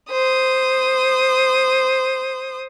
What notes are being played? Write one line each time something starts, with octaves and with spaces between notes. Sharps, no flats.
C5 D#6